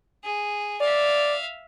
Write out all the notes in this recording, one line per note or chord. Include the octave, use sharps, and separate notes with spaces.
G#4
D5 E5 F5